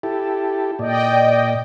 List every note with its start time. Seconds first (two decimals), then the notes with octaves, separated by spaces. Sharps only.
0.03 E4 G4 A4
0.79 A#2 D5 D#5 G5